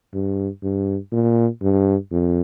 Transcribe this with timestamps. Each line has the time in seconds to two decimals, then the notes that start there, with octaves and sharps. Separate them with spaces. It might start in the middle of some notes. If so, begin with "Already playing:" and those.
0.14 G2
0.62 G2
1.12 A#2
1.62 G2
2.12 F2